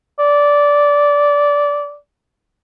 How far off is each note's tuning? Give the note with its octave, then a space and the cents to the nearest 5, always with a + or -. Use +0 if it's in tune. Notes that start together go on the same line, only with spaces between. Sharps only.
D5 -15